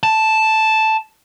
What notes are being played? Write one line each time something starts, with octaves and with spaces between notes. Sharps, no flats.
A5